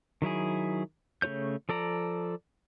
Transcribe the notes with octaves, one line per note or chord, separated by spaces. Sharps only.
D#3 F#3 E4 G#4
C#3 A3 F4 C#5 G6
F3 A4 D5 A#5